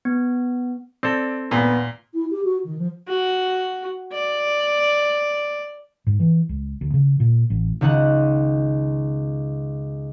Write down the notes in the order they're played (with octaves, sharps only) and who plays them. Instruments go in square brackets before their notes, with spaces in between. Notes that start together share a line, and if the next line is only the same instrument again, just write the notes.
[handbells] B3
[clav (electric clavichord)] C4 A4 [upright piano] D5
[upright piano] D#2 [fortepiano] A#2 [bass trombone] B3
[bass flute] E4
G4
F#4
D#3
F3
[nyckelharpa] F#4
D5
[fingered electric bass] G#2
E3
C#2
D2
C#3
A#2
A1
[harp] C#2 D#3 C#4 F#5 F#6